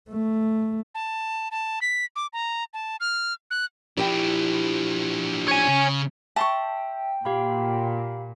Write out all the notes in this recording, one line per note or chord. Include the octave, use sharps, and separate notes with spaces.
A3
A5
A5
B6
D6
A#5
A5
F6
F#6
F3 D4 E4 G4 G5
C#5 G#5
C#3
E5 G5 A5 C6 C#6
A#2 G4 F5 B5